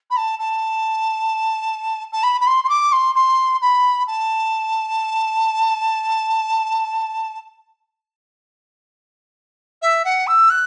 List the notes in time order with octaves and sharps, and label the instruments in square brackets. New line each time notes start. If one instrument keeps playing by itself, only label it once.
[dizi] B5
A5
A5
A5
B5
B5
C6
C6
D6
C6
C6
B5
A5
E5
F#5
E6
F#6